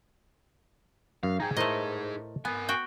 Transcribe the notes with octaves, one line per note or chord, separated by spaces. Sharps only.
F#2 F5
D#4 G#4 G5 G#5 A#5
A2 A3 A#4 C5 D#5
B3 A#4 G#5
F#4 G5